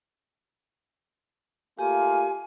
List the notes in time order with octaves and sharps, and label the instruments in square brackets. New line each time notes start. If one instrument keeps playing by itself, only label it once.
[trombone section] A3 A#3 F4 [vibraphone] G4 [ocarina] G#5